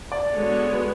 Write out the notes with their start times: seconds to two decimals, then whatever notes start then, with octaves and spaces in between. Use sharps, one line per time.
0.12 D5
0.32 D3 G#3 B3 F#4 C#5
0.73 B4